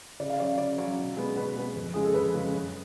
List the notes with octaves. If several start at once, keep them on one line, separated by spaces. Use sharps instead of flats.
C#3 D5
F5
F#3 C#4 D5
C#3 D5
F#3 C#4
B2
G#3 B3
B2 B4
G#3 B3
F2
C#3 G#3 G#4
A4
F2 B4
C#3 G#3
F#2